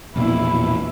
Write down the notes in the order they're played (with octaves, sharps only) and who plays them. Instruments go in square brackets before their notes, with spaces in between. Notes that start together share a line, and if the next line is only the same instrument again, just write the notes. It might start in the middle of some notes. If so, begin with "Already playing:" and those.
[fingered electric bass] E1 A#1 A#2 [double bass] B3 E4